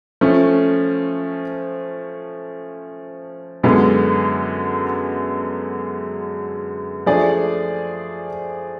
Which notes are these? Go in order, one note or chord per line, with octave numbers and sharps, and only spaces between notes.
F3 A3 C#4
F#2 D3 G#3 B3
F3 A3 D4 G#4 D5